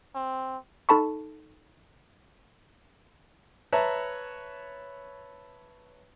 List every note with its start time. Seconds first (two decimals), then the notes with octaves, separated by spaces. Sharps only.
0.15 C4
0.89 D#4 A4 A5 B5 C#6
3.72 B4 C#5 E5 A5 A#5